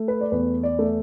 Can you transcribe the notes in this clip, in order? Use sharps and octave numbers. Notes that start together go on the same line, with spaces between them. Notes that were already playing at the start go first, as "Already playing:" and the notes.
Already playing: A3
B4
D5
E2 B4
D5
A3